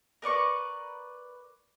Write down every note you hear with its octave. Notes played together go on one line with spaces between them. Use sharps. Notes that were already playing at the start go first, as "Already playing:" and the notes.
A#4 B4 D5 C#6